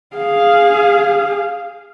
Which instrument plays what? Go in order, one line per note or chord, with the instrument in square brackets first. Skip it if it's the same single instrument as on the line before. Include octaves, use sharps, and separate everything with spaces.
[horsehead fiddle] G#4 F5